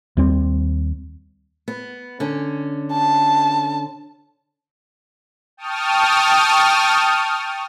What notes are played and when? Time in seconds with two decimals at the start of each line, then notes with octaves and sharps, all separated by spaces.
0.17 D#2 G3 C4
1.68 B3
2.20 D3 C#4
2.93 A5
5.57 G5 A5 C#6 D#6 F6